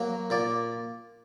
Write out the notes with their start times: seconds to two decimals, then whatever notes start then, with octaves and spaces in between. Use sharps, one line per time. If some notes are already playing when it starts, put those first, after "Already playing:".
Already playing: F#3 A#3
0.30 A#2 D5